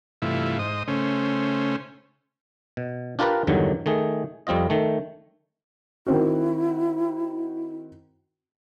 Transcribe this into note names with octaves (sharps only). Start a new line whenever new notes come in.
G2 C3 E3 A3 E4 F4
G#2 C5 D#5 D#6
C#3 A3 C#4 C5
B2
D4 F4 G4 A#4 B4 D5
E2 G2 D3 D#3 F#3
D#3 A3 G#4
F2 G3 C4 F4 D#5
D#3 A3
D#3 C4 E4 F#4